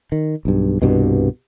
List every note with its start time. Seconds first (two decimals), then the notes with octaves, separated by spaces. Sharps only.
0.12 D#3
0.45 B1 G2
0.82 C2 G2 B2